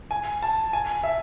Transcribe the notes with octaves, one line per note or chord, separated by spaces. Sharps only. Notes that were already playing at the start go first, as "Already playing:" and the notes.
G#5
A5
G#5
E5